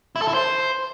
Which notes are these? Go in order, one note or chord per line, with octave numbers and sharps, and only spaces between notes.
E4
A4
E4
C5